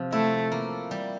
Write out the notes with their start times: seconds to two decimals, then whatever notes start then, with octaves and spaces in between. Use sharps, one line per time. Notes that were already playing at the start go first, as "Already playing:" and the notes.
Already playing: C3 F3
0.12 A3 E4
0.52 A#3
0.91 G3